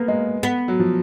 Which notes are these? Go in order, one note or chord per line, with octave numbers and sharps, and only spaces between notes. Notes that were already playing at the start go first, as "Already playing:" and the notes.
Already playing: A#3 B3
G#3
B3
F#3
F3